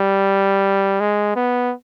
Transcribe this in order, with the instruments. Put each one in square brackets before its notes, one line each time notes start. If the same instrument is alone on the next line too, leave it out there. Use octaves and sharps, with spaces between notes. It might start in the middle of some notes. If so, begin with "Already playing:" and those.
Already playing: [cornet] G3
G#3
B3